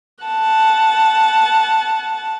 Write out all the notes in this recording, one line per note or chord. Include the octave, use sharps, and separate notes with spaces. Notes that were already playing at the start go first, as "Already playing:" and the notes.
F#5 A5